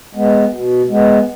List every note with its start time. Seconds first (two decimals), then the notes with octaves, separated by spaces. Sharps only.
0.15 G#3 B3
0.52 B2
0.89 G#3 B3